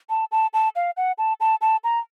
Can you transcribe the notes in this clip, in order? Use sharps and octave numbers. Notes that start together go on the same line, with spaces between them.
A5
A5
A5
F5
F#5
A5
A5
A5
A#5